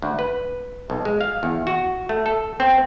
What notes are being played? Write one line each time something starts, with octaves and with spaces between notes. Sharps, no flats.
D2
B4
B1
G#3
F5
E2
F#4
A3
A4
C4